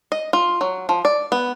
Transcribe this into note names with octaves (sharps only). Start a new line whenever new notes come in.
D#5
F4
F#3
F3
D5
B3